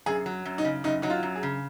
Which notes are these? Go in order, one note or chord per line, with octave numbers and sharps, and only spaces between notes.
F#2 G#4
F#3
F#2
D#4
C#3
F#2 D#4
F#3 D#4
F4
F#2
G#4
C#3